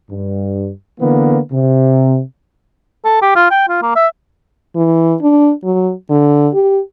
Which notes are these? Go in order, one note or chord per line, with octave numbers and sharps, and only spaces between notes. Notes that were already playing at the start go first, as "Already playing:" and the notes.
G2
D3 E3 A#3 B3
C3
A4
G4
F4
G5
F4
A#3
E5
E3
D4
F#3
D3
G4